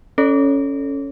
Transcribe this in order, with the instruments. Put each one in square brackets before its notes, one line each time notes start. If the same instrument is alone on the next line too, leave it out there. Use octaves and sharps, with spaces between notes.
[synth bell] C#4 A4 C#5